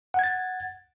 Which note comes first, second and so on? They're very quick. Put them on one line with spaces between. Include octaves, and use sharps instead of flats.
F#5 G#6 A6